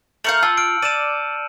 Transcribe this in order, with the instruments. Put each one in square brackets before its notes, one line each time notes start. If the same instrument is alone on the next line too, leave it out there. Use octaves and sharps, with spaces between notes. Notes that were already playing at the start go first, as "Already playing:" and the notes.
[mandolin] A3 A#4 F5 [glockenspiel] G6 C#7 F#7
[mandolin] F4 [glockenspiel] A5 E6
[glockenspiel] F6 D7
[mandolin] D5 [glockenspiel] D#7 E7